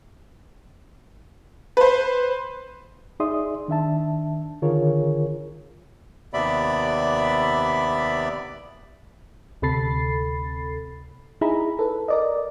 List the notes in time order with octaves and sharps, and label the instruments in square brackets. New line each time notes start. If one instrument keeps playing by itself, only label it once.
[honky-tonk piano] B4 C5
[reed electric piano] D#4 G#4 D5 E5 C6 D#6
D#3 D4 E5 A5
D3 D#3 F4 G#4 A#4 C#5
[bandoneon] D#2 C3 B3 D5 E5 B5
[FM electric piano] D2 C3 A4 B5 A6 C7
D#4 E4 G#4 A#5 B5
A4 B4
A#4 D5 D#5